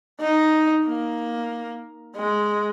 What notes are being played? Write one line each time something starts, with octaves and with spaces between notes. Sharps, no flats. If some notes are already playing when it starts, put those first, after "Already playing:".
D#4
A#3
G#3